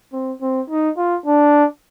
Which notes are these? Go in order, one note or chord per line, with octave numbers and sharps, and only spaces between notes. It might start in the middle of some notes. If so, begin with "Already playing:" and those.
C4
C4
D#4
F4
D4